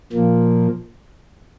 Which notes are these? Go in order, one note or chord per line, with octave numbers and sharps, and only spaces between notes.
A#2 F3 A#3